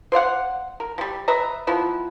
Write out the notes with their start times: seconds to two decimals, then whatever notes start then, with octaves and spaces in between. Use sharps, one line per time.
0.12 C5 D5 F5 F#5
0.80 A#4
0.98 F3 G3
1.28 B4 D#5 E5 A#5
1.67 F3 B3 E4